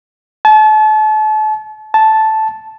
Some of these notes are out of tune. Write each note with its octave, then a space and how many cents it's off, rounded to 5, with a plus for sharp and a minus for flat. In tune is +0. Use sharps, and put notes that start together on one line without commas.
A5 -35
A5 -5